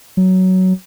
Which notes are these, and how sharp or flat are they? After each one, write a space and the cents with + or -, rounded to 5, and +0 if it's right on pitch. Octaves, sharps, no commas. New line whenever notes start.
F#3 +10